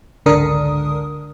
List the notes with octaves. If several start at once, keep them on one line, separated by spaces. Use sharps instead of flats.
G#1 C#2 D3 D4 A#4 D#6